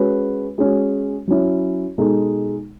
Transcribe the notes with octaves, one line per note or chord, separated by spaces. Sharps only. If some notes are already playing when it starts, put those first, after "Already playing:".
Already playing: G#3 C#4 F#4 B4
G#3 C#4 F#4
F#3 C#4 E4
B2 G#3 D#4 A4